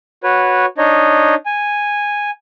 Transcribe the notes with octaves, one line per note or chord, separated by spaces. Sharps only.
F#4 B4 C#5
D4 D#4 C#5 D#5
G#5